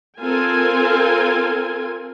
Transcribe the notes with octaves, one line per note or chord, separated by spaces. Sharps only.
C4 F4 A4 A#4 G#5